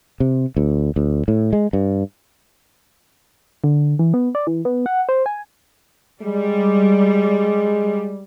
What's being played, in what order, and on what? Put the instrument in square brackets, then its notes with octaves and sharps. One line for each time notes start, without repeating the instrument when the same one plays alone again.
[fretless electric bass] C3
D2
D2
A2
G#3
G2
[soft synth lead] D3
E3
B3
D5
E3
B3
F#5
C5
G#5
[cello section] G3 [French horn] G#3